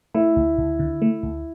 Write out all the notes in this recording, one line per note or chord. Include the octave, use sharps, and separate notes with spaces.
A3 E4
D2
D2
D3
A3
D2